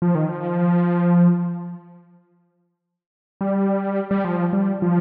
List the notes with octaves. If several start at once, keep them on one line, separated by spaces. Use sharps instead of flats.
F3
D#3
F3
G3
G3
F3
G3
F3